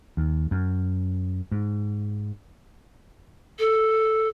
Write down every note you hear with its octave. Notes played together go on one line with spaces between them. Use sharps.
D#2
F#2
G#2
A4